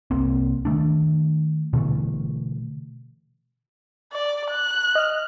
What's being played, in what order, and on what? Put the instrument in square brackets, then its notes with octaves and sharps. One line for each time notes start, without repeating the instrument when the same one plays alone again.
[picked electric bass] C2 A#3 C4
D#3 A3 D4
B2 D3 E3 A3
[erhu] D5
F#6
[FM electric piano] D#5 F6